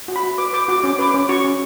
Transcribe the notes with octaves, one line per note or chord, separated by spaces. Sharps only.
F#4
B5
F#4
B4 D6
B4 D6
F#4 D6
C#4 D6
B4 D6
C#4 D6
F#4 C#6
C#4